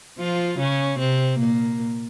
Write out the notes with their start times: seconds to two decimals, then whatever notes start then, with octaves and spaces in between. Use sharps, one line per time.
0.19 F3 F4
0.59 C#3 C#4
0.99 C3 C4
1.39 A#2 A#3